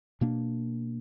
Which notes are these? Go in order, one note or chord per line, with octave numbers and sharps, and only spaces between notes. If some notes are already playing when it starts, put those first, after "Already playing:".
B2 A#3 D4